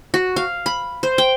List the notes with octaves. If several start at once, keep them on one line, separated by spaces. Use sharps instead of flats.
F#4
F5
B5
C5
G5